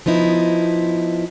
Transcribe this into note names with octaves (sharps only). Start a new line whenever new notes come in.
F3 B3 D#4 E4